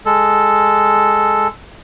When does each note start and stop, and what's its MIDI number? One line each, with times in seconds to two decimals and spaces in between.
0.06 1.47 56
0.06 1.47 69